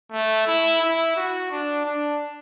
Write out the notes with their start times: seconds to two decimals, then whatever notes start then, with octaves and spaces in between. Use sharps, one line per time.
0.12 A3
0.47 E4
0.81 E4
1.16 F#4
1.51 D4
1.86 D4